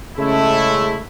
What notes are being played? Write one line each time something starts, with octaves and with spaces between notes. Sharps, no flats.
C#3 G#3 A3 E4